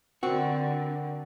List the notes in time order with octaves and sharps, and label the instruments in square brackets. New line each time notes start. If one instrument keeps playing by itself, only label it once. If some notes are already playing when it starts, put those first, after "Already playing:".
[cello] D3 [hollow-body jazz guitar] C4 F#4 [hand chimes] A#4 F#5 G5